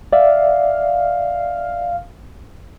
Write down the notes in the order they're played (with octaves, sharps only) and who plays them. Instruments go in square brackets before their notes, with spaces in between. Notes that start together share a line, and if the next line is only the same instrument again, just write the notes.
[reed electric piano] D5 E5 [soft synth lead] F5